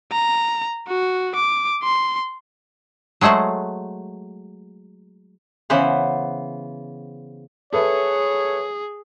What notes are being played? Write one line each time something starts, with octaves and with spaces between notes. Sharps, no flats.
A#5
F#4
D6
C6
F#3 G#3 A3 C5 F#5
C#3 E3 B3 C5 F#5
G#4 A4 B4 C#5 E5